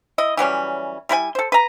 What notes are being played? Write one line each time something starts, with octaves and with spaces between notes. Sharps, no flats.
E4 D#5
E3 F#3 G3 C#4
G3 E4 B4 G#5
A4 C5
B4 A#5